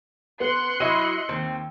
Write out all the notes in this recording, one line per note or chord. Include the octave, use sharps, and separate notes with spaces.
B3 C6 F#6 C#7
F#3 E4 D#5 E6 D#7
D#2 C4